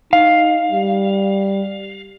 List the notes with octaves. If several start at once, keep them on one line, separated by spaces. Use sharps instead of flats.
D#4 F5
G3